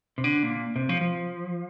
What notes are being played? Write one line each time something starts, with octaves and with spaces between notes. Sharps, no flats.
C3
D3
A#2
C3
F3
F3